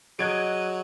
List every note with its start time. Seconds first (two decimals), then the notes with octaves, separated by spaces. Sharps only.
0.19 F#3 G#4 D#5 F#6 G#6 D7